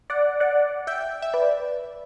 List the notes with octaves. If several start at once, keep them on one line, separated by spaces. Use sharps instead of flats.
D5 F#5
D5 F#5
E5 G5
E5
B4 D5